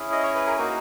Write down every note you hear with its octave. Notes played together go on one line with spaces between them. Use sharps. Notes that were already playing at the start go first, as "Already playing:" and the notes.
Already playing: C#4 E4 G#4
D#5
C#5
B4
A#4
A#3 D#4 F#4 A#4